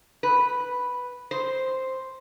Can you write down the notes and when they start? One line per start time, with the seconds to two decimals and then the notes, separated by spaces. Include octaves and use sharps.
0.23 B4
1.31 C5